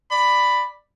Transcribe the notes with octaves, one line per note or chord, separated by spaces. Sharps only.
D5 B5